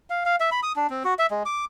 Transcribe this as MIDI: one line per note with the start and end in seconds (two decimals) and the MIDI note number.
0.10 0.23 77
0.25 0.36 77
0.40 0.50 76
0.52 0.60 83
0.63 0.72 87
0.76 0.87 62
0.90 1.03 60
1.04 1.14 66
1.19 1.26 76
1.31 1.43 56
1.46 1.65 86